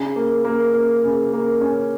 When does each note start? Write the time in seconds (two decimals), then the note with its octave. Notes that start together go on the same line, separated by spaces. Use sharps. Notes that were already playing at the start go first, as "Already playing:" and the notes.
Already playing: C#3
0.16 A#3
0.45 A#3
0.74 A#3
1.04 C#3
1.33 A#3
1.61 C#4